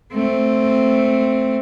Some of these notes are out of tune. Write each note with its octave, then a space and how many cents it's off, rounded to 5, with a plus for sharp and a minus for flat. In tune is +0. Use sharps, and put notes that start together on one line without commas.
A3 +0 C4 +0